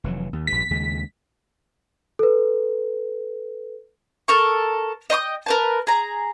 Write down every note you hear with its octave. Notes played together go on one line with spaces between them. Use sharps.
F1 E3 F#3
D#2
A#1 G2 B6
D#2 C#3 G#3
A4 B4
A4 A#4 C#6
D#5 G5 C6 D#6
A#4 B4 A5
G#4 A#5